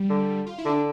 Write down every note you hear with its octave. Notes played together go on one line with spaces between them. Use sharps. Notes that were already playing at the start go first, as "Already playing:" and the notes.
Already playing: G3
D3
F4
E4
D3 D4